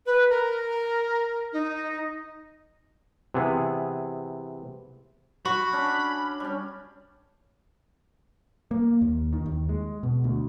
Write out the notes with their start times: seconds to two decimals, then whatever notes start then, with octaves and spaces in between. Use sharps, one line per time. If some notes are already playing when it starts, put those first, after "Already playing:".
0.06 B4
0.30 A#4
1.53 D#4
3.34 C3 E3 B3 G#4
5.45 F#4 B5
5.73 C#4 D4
6.40 G3 C#4
8.71 A#3
9.01 D#2
9.33 D#3
9.46 D#2
9.69 G#3
10.03 B2
10.24 D2